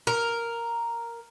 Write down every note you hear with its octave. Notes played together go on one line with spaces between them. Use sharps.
A#4